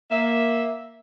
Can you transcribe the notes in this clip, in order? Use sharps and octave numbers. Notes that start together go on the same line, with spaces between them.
A#3 E5